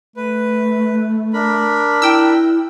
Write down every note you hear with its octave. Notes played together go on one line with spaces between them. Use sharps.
A3 B4
D4 A#4 B5
E4 G5 E6